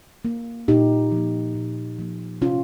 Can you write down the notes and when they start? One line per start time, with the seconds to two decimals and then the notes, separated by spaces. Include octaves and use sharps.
0.25 A#3
0.68 A#2 D#4 G4
1.12 F3 A#3
1.55 A#2
1.98 F3 A#3
2.41 C3 C#4 F4